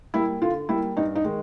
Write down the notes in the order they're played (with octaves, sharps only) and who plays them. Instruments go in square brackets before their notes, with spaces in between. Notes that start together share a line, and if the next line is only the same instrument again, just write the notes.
[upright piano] G3 A#3 [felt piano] E4
[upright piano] D3 [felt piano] F4
[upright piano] G3 A#3 [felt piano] E4
[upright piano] G2 [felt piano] D#4
[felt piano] D#4
[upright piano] D#3 G#3